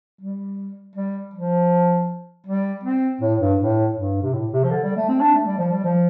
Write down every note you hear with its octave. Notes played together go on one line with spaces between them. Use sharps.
G3
G3
F3
G3
C4
A2
G2
A2
G2
C3
A2
C3
F3
D3
G3
A3
C4
D4
A3
G3
F3
G3
F3